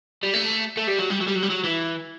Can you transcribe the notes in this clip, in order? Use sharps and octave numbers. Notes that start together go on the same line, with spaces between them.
G3
A3
A3
G3
F#3
G3
F#3
G3
F#3
G3
F#3
E3